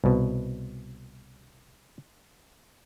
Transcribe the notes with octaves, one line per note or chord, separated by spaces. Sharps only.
C2 B2